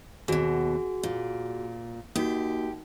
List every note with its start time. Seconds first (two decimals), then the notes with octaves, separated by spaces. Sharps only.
0.28 D#2 B2 F#4 G#4
1.03 A#2
2.16 A#3 D#4 F#4 G4